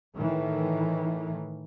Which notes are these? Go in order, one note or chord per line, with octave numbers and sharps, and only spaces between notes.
A2 D#3 E3